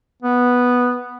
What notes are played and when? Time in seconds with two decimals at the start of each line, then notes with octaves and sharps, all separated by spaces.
0.22 B3